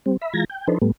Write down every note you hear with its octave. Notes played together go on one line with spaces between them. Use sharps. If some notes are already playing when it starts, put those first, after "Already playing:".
G3 C4
E5 B5
E3 G#3 F4 A#5 G#6 A#6
G5
F3 D4 D#4 A4 B4 C5
A2 G3 A3 B3